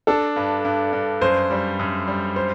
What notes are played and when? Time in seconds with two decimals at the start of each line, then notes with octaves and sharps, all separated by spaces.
0.07 D4 A4
0.36 G2
0.65 G2
0.93 G2
1.21 F#2 C5
1.51 G3
1.79 F#2
2.07 G3
2.36 C5